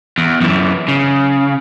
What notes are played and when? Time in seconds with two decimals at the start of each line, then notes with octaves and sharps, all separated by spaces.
0.18 E2
0.41 F#2 E3
0.88 C#3